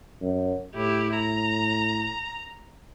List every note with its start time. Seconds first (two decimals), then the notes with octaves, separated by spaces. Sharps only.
0.22 F#2
0.75 A2 E4 G4
1.16 A#5